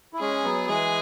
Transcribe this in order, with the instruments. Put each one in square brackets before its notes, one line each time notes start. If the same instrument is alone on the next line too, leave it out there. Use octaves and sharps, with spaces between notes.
[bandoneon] E4
[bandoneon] G#3 C#4 [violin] G#4
[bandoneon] F#3 B3
[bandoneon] E3 G#3 [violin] G#4